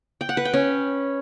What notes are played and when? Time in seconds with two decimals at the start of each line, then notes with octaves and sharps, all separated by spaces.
0.21 G5
0.29 F#5
0.37 B4
0.45 G5
0.54 C#4